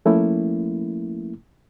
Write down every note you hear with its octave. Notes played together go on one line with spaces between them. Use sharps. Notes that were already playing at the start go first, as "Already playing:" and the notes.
F3 A3 A#3 C#4 E4